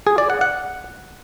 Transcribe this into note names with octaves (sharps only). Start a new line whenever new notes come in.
G#4
D5
F#5
F#5